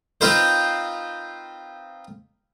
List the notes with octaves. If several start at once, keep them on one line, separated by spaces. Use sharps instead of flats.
C4 D#4 F4 B4 C5